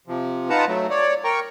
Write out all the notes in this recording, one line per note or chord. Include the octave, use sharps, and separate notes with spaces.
C3 F3
D#4 F4 B4 F#5 A5 A#5
F#3 A3
C#5 D5
A#4 G5 A#5 C#6